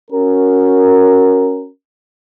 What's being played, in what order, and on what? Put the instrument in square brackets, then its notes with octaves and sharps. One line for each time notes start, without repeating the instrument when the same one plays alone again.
[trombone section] C#4 F#4 A#4